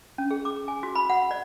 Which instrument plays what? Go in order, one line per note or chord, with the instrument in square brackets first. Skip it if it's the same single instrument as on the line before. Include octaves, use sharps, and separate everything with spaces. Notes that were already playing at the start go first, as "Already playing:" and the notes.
[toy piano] C#4
G#4
D6
G#5
F#4
B5
F#5
D5